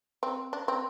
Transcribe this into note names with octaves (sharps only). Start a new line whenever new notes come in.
C4
D4
C4